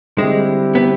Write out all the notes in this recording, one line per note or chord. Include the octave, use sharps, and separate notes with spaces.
D3 G3 G#3 C4 E4 G4
B3